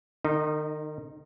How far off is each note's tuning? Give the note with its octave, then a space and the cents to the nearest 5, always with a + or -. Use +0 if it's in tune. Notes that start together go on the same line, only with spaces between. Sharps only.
D#3 -35 D#4 +0